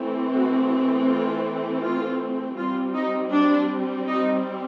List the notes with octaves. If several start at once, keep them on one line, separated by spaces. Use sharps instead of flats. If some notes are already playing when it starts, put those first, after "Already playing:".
Already playing: E3 A3 C4
F#4
F4
F4
G3 C4 F4
D#4
D4
D#4